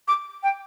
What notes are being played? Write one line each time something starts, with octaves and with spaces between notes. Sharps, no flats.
D6
G5